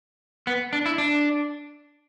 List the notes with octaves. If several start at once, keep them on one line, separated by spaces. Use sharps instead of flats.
B3
D4
E4
D4